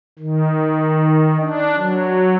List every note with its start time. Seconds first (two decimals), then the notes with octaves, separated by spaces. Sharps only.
0.19 D#3
1.40 D4
1.77 F#3